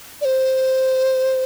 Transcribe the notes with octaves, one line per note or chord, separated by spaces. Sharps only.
D5
C5